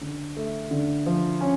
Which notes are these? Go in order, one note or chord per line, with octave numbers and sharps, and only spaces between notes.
D3
A3
D3
F3
C#4